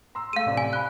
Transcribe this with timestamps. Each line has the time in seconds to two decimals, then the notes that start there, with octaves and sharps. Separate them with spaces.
0.15 A#5 C6 E6
0.33 G#3 A3 F5 D#7
0.46 A1 C3 D4
0.57 G#5
0.73 F5 B5 F#6 G7